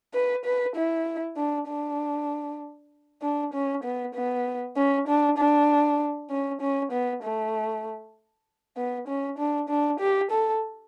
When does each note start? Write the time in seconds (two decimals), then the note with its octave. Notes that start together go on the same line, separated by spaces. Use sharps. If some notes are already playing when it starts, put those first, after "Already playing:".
0.14 B4
0.45 B4
0.76 E4
1.37 D4
1.68 D4
3.22 D4
3.53 C#4
3.83 B3
4.14 B3
4.77 C#4
5.07 D4
5.37 D4
6.30 C#4
6.61 C#4
6.92 B3
7.23 A3
8.77 B3
9.08 C#4
9.38 D4
9.69 D4
10.00 G4
10.31 A4